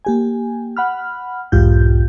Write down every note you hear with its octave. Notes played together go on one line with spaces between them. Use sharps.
A#3 G4 G#5
F#5 B5 F6
B1 E2 G#2 F4 G4 G6